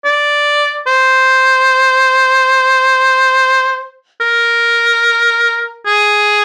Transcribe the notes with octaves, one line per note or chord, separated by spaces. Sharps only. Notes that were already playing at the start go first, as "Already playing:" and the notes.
D5
C5
A#4
G#4